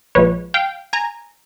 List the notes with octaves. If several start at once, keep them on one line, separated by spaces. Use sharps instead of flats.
A#1 A#2 F3 G#3 B4 C#5
F5 G5
G#5 A#5